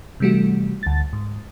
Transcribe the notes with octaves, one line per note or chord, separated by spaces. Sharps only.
C3 E3 G3 A3 F#4
D2 A6
G#2